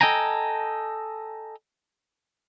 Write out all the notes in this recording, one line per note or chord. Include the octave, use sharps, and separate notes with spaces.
A4 D#5 G5 G#5 A#5